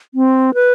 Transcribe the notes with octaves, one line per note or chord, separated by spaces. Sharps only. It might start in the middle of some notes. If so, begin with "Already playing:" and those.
C4
B4